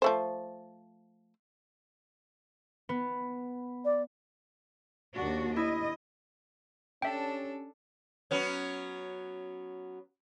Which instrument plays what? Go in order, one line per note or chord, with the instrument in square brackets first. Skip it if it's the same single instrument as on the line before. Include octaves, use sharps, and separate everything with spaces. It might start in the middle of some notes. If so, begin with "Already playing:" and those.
[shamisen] F3 A3 C5
[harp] B3
[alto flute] D5
[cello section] D#2 D4 F#4
[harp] E4 [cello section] D#5
[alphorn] C#4 [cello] D4 A4 [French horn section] G4 C#5 [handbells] E5 G5
[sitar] F#3 B3 C#4